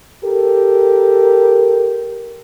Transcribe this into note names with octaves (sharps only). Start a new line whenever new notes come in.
G4 A4 A#4